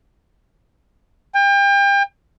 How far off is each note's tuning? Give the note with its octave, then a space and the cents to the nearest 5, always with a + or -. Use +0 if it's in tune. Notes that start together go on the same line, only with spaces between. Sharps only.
G5 +35